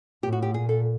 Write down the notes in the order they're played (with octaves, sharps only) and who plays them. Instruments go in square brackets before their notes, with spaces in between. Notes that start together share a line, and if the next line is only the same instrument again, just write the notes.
[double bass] A2 [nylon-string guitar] G4
[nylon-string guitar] F#4
G4
[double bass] A#2 [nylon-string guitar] G#4
[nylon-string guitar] A4